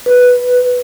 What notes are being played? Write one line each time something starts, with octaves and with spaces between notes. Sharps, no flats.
B4